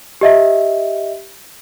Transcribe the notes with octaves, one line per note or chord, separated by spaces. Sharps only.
G4 D#5 E5